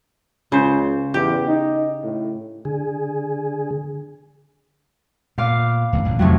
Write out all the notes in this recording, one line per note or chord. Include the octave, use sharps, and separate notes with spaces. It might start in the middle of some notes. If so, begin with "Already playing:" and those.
C#2 C#3 C5
E2 G4
D#4
A2
D3 G#4
A#2 B3 F5 D6
D1 A1 F#2
D#1 A1 D3
F2 A2 C3 D#3 F#3